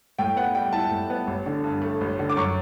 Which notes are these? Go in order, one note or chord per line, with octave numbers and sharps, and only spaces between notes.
A2 G5
B3 F#5
G3 G5
E4 A5
A2
B3
A1
D3
G2
A3
A1
D3
D6
F#2 C#6